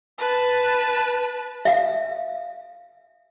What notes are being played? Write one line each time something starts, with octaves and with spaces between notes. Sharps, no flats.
B4 A5
E5 F5